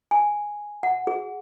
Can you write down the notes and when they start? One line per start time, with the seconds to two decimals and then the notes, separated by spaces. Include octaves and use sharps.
0.11 G#5
0.83 F#5
1.07 G#4